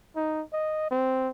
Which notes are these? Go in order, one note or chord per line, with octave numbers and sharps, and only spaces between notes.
D#4
D#5
C4